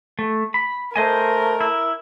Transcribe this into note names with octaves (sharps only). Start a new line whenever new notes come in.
A3
B5
A3 A#4 C5 D#5 G#5
E4